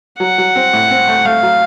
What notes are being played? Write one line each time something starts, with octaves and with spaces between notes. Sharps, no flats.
F#3 F#5
F#3
C4
A2
C4
A3
A3 F5
F#3